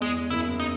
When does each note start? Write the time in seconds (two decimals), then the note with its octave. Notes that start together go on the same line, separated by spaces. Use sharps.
0.01 E2 G#3
0.30 F#1 E4
0.60 D#4